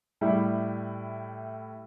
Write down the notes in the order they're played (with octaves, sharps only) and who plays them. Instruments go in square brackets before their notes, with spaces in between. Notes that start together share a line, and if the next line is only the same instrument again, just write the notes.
[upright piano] A2 G3 E4